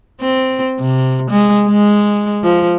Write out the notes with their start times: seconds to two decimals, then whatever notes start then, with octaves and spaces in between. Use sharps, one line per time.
0.21 C4
0.80 C3
1.30 G#3
1.67 G#3
2.44 F3